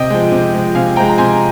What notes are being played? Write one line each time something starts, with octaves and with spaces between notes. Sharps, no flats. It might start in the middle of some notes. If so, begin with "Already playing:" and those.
Already playing: C3 D#5 G5
F3 G#3
C3
F3 G#3
C3 F5 G#5
F3 G#3 G5 A#5
A#5
C3 G#5 C6